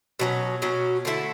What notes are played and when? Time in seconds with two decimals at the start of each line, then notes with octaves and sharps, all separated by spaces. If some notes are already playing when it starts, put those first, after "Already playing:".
0.19 B2 F#3 C#4
0.62 B2 F#3 C#4
1.05 D3 A3 E4 A4